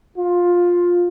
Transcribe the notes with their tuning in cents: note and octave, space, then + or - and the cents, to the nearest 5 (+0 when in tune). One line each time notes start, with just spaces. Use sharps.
F4 +10